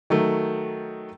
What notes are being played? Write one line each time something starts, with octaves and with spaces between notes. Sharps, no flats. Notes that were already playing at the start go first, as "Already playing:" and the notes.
D#3 F#3 A3